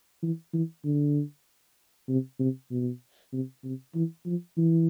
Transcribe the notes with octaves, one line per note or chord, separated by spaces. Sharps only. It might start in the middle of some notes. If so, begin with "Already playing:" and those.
E3
E3
D3
C3
C3
B2
C3
C3
E3
F3
E3